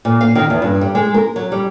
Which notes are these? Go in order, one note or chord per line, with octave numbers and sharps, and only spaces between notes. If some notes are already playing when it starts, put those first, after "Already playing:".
A#2
F5
D#3
E2
G2
G3
G#3
A#4
F#3
G3